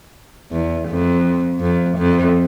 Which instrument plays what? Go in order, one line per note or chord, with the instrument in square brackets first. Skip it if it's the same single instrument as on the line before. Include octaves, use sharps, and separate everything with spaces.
[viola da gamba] E2
F2
F2
F2